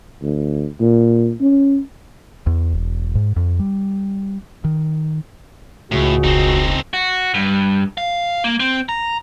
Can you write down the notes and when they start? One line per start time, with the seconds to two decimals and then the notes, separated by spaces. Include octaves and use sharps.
0.23 D2
0.80 A#2
1.41 C#4
2.46 E2
2.74 E1
3.15 G#2
3.36 F2
3.59 G3
4.64 D#3
5.92 C#2 A2 C#3 F#4
6.24 E1 C4 D#4
6.93 F#4
7.34 G2
7.98 F5
8.44 A#3
8.60 C4
8.89 A#5